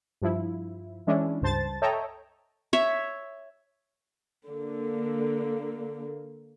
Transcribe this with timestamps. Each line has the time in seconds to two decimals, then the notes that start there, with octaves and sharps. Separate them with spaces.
0.22 G2 F3 E4
1.07 E3 G#3 C#4 D4 E4
1.42 C#2 G2 C5 A5 A6
1.82 A4 C#5 D#5 E5 G5 A#5
2.73 C#5 E5
4.48 D3 A#3